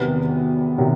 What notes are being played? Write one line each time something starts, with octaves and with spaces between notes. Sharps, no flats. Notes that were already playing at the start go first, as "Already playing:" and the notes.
Already playing: E2 C3 D#3 F#3 B3
C3 D#3 F#3